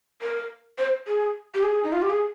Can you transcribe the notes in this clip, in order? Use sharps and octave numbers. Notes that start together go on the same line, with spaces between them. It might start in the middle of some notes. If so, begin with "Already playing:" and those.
A#4
C5
G#4
G4
G#4
D#4
F4
G4
G#4